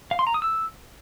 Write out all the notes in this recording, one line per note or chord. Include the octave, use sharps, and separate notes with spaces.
F5
C6
A#5
D#6
E6